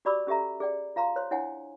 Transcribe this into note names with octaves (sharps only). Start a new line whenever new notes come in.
F#4 G4 D5 B5 D6 E6
C#4 G4 A4 E5 A#5
G#4 D5 G5
F4 F5 A#5 C6
C5 C#5 C6
D4 E4 C#5 F#5 G#5